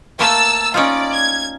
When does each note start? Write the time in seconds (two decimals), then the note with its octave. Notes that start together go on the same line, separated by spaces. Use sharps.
0.19 A3 A#3 A5 E6
0.74 C#4 D#4 F4 D5
1.12 G#6